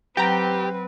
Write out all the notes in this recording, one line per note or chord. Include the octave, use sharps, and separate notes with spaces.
F#3 C4 G4 B4 G5 A#5